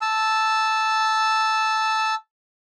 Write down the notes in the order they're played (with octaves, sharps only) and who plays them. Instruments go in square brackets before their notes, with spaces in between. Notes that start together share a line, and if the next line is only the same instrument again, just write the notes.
[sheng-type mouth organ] A5 E6